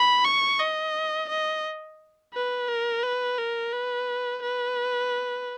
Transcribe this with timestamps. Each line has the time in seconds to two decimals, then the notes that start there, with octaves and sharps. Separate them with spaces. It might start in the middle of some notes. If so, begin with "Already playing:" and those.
Already playing: B5
0.25 C#6
0.59 D#5
1.29 D#5
2.34 B4
2.68 A#4
3.03 B4
3.38 A#4
3.73 B4
4.42 B4